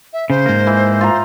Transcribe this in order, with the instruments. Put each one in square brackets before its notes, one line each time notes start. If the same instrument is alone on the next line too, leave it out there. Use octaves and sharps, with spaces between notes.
[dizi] E5
[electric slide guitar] C#3 [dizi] C5
[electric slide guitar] G#2 A#3
[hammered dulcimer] E3
F4 A#5